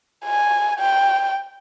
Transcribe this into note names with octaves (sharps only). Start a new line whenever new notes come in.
G#5
G5